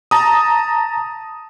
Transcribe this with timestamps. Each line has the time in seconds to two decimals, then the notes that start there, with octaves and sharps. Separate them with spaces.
0.11 A5 A#5 D#6